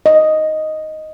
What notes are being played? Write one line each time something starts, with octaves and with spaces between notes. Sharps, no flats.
D#5